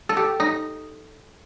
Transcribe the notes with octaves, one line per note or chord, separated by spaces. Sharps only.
A4
G4
D#4